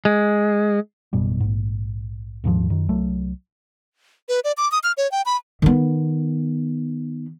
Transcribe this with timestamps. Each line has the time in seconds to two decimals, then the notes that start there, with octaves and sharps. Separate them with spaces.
0.05 G#3
1.13 A1 F#2 B2 G3
1.40 A#1 G#2
2.44 D#1 D#2 G#2 F3
2.70 F#2 D#3
2.89 C2 F#3 A3
4.29 B4
4.44 D5
4.57 D6
4.72 D#6
4.84 F6
4.97 C#5
5.12 G5
5.26 B5
5.62 D#3 B3